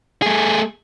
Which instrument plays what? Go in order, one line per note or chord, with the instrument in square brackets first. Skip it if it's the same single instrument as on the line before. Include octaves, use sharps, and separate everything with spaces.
[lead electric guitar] A3 G#4